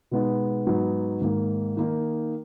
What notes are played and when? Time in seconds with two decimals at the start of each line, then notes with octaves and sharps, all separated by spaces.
0.11 B2 G#3 B3 D#4
0.67 G#2 F#3 B3 D#4
1.22 G#2 D#3 A#3
1.77 D#3 A#3 D#4